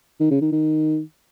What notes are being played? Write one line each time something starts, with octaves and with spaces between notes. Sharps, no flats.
D#3
C#3
D#3
D#3